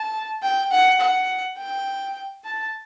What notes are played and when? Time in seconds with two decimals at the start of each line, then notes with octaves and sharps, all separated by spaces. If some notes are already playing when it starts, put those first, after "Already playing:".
Already playing: A5
0.43 G5
0.71 F#5
1.00 F#5
1.58 G5
2.45 A5